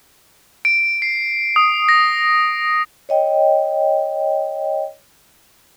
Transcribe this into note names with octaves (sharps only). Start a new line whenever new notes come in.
D7
C7
D#6
A#6
C#5 D#5 G5